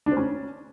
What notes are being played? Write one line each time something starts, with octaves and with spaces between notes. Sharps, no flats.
D4
C4
C#4